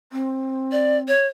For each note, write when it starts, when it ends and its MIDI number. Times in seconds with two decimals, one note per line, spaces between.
0.12 1.10 60
0.72 0.97 74
1.08 1.27 73